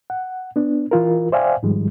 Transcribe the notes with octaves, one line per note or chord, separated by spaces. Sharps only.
F#5
B3 D4
E3 F4 A#4
C5 D5 E5 F5 G5 G#5
G#2 D#3 F3 G3 G#3